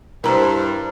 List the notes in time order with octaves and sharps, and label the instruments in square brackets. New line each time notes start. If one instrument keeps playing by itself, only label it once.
[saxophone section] G2 [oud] E4 C5 [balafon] A#4 A#5